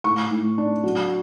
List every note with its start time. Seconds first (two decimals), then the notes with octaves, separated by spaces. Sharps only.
0.04 A2 C#6
0.31 A2
0.58 D4
0.84 F#3